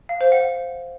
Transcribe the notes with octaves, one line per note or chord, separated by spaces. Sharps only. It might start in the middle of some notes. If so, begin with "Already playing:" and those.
F5
C5
F#5